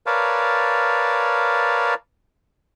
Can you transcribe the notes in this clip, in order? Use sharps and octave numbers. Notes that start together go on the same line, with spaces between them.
A#4 B4 C#5 D5 F5 A5